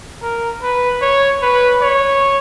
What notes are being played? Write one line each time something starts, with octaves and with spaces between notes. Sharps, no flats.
A#4
B4
C#5
B4
C#5